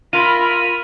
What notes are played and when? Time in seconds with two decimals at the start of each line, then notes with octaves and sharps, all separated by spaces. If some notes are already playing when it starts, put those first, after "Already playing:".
0.13 E4 F4 A#4 B5 D#7